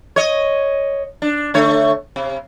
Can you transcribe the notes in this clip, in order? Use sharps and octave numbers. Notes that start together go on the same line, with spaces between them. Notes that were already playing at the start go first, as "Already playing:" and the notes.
C#5 D#5
D4
D3 A3 C#5
C3